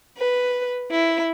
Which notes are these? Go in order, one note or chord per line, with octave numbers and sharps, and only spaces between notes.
B4
E4